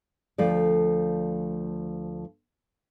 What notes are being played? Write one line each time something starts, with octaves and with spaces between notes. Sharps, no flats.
D2 F3 A3 A4 D5